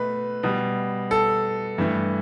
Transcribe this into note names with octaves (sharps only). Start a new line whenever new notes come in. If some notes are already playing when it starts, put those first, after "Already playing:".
Already playing: B2 A3 B4
B2 G3
A4
G2 E3 A3